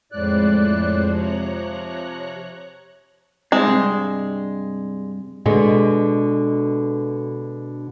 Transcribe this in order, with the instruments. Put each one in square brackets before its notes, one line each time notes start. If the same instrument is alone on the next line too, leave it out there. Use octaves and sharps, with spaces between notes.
[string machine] F2 G#3 C5 [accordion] A2 D5 F#6
[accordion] C3 F3 [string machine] C#5 A#5 F#6
[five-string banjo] G#3 [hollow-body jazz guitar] C4 E4
[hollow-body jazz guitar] G2 C3
[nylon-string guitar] B2 D3 G#3